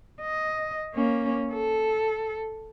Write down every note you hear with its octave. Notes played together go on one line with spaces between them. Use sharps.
D#5
A#3 C#4
A4